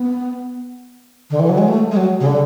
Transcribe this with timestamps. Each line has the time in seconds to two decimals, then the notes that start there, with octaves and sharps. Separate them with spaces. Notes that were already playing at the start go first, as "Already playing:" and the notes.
Already playing: B3
1.30 D3
1.39 E3
1.49 F#3
1.58 G#3
1.68 A3
1.91 G#3
1.97 F#3
2.20 C#3
2.26 D3